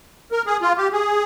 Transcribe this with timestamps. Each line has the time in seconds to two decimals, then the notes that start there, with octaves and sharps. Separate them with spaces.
0.32 A#4
0.46 G#4
0.62 F4
0.78 G4
0.93 G#4